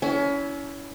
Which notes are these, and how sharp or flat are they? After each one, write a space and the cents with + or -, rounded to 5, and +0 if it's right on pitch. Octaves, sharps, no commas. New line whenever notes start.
C#4 +30 E4 -5